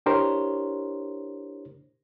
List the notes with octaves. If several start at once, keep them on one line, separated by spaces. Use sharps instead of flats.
D4 E4 G4 A#4 C5 C#5